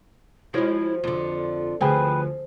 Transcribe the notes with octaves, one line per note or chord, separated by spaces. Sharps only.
F3 G#3 E4 F#4 C5 C#5
F2 D3 F4
D2 F3 G#4 B4 C5 G5 G#5 B5